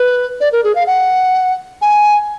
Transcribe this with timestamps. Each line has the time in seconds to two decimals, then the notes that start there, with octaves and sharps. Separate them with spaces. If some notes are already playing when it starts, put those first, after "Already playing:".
Already playing: B4
0.41 D5
0.52 A#4
0.64 G#4
0.75 F5
0.87 F#5
1.82 G#5